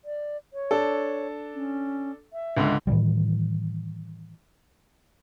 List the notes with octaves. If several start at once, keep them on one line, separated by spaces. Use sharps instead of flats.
D5
C#5
D4 A4
C#4
E5
C#2 G#2 D3
A2 D#3 E3 G3